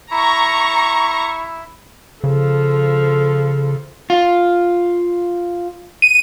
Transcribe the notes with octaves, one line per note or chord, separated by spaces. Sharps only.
E4 A#5 C#6
C#3 F3 A4
F4
D#7